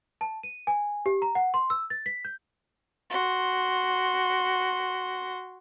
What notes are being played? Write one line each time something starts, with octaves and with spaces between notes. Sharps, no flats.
A5
D#7
G#5
G4
A#5
F#5
C6
E6
A6
B6
G6
F#4 C6